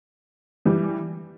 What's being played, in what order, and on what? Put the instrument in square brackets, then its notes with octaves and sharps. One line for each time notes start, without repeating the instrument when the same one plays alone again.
[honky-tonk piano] E3 G3